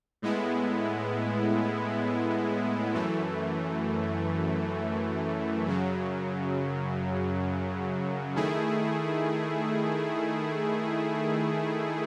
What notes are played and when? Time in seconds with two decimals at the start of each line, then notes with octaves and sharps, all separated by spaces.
0.22 A2 G#3 B3 E4
2.94 F#2 E3 A3
5.65 F#2 C#3 F#3
8.36 D#3 A3 E4 G#4